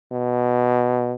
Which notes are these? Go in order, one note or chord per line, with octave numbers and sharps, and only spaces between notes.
B2